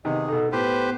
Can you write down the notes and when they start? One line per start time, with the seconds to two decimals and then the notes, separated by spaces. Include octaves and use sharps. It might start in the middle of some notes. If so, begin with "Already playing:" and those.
0.05 C3 D#3 B3 G#4 D#5
0.28 B2 D#4 A4
0.52 A2 B3 G4 B4 C5